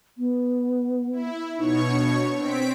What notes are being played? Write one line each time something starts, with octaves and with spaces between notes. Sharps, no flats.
B3
E4
B2 D#4 C#5 C#6
D4
C4 B6 D7